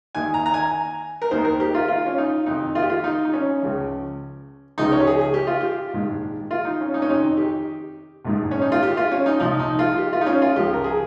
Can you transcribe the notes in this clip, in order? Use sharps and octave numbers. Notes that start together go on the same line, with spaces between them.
D#2 D#3 G#5
A#5
A#5
G#5
A#4
D#2 D#3 C5
A#4
G4
F4
F4
C#4
D#4
F2 C3 D#3 D#4
F4
G4
F4
D#4
D#4
C#4
C#2 C#3 F3
C#2 C#3 F3 D#4
C#5
G4
G#4
G#4
G4
F4
G4
A#1 G#2 D#3
F4
D#4
C#4
D#4
C#4
F2 C3 D#3 D#4
G4
A#1 G#2 D#3
C#4
D#4
F4
G4
F4
C#4
D#4
C2 A#2 F3 D#4
D#4
F4
G4
F4
D#4
C#4
F4
C#2 C#3 F3 G4
A#4
G#4